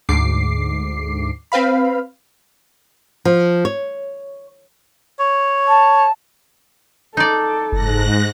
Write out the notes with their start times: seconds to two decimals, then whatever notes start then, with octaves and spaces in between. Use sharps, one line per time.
0.09 D2 G#2 D6 C7
1.52 C4 B4 F5 B5
3.25 F3
3.65 C#5
5.20 C#5
5.67 A5
7.17 D#4 A4 D5
7.72 F#1 G#2 F#6 A#6